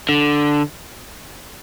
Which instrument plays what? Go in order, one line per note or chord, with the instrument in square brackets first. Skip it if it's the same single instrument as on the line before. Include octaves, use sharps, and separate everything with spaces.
[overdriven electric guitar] D3